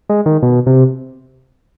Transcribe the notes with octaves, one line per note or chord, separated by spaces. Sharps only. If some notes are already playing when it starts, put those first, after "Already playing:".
G#3
D#3
B2
C3